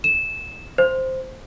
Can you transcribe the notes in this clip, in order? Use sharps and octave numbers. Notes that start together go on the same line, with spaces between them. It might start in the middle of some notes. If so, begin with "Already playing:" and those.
E7
C5